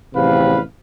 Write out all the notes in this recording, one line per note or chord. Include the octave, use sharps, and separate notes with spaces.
A1 E2 C3 F3 B4 F5